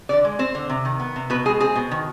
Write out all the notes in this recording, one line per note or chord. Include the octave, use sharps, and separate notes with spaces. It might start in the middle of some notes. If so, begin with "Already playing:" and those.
D3 D5
G#3
C4 C5
D3
C3
D#3
B3
C3
B2 B4
G#3 G#4
C4 G#4
B2
D#3